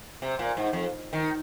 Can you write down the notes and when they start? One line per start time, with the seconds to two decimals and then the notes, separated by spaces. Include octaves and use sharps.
0.22 C3
0.39 A#2
0.57 G#2
0.73 F2
1.13 D#3